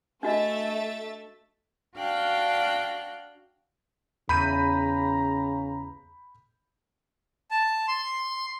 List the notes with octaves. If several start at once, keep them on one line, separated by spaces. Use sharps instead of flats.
A3 D4 F#4 D#5 E5 A6
D4 F#4 F5 G5 F6 F#6
E2 C#3 A#5 B5 G6 D#7
A5
C6